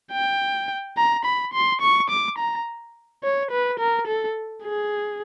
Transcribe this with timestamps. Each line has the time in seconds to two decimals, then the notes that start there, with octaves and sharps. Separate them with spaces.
0.12 G5
0.97 A#5
1.25 B5
1.53 C6
1.81 C#6
2.09 D6
2.38 A#5
3.23 C#5
3.51 B4
3.79 A#4
4.07 A4
4.64 G#4